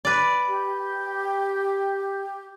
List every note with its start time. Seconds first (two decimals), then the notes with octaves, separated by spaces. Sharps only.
0.05 B4 D5
0.47 G4